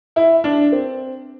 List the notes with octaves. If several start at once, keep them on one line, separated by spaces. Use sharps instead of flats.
E4
D4
C4